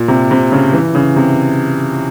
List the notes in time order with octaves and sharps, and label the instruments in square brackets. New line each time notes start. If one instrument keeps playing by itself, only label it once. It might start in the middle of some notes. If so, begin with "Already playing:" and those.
Already playing: [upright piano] A#2
C3
C3
C#3
E3
C#3
C3